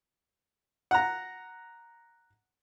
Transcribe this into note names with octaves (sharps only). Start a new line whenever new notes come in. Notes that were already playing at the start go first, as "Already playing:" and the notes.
F#5 A#5